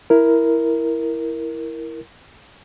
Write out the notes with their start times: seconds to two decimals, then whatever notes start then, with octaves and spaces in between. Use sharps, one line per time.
0.10 E4 A#4